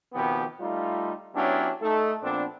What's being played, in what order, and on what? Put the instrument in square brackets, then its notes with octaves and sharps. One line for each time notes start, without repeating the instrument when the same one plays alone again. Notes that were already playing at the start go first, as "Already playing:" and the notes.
[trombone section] B2 D#3 F3 B3 C4 G4
G3 A3 D#4 F4
F#3 B3 C#4 D4 E4 G4
A3 D#4 A4
A#2 F3 B3 C4 D4